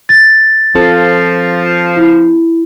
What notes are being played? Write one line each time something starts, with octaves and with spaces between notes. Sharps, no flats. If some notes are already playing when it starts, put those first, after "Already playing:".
A6
F3 C4 F4 A4
E4